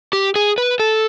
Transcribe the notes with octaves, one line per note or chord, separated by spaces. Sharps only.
G4
G#4
B4
A4